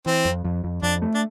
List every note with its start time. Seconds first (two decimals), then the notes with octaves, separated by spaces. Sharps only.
0.06 E3 C4
0.25 F2
0.45 F2
0.64 F2
0.83 F2 D4
1.02 A3
1.14 D4